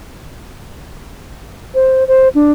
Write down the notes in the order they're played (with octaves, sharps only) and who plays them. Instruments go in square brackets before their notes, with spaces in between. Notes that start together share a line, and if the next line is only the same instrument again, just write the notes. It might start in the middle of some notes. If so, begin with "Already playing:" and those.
[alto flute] C5
C5
D4